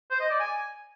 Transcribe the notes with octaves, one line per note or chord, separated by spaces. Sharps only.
C5
D#5
D5
G#5